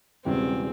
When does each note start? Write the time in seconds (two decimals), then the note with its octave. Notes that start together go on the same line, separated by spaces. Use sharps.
0.25 E1 E2 C#3 G3 C4